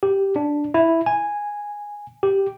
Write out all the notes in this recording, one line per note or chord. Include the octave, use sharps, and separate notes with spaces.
G4
D4
E4
G#5
G4